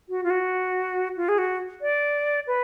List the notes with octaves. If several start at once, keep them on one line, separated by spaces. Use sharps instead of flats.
F#4
F4
F#4
F4
G#4
F#4
D5
B4